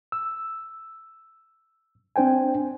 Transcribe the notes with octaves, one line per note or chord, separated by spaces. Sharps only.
E6
C4 D4 C5 G5 G#5